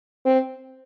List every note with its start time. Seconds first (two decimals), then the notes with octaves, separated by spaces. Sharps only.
0.25 C4